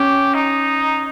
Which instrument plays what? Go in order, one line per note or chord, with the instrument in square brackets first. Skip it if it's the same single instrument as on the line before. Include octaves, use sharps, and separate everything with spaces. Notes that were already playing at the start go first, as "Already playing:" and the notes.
Already playing: [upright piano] C#4 [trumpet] G4
[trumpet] D#4